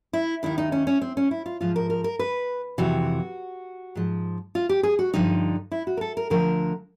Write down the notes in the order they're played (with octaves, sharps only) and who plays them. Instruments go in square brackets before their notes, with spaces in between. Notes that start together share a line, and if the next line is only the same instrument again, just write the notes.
[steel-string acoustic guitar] E4
D#2 D#3 E4
D#4
C#4
C#4
C4
C#4
E4
F4
G#2 F3 F4
A#4
A#4
A#4
B4
F2 C3 E3 F#4
G#2 F3
F4
G4
G#4
F#4
G2 D3 F3 D#4
E4
F#4
A#4
A4
A#4
D2 D3 F3 A#4